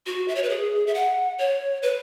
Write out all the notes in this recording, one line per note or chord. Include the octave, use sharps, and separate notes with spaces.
F#4
E5
C#5
B4
G#4
E5
F#5
C#5
B4